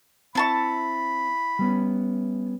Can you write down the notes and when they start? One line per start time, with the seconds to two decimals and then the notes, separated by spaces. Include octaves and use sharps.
0.35 C4 E4 A5 B5 C#6
1.59 G3 B3 C#4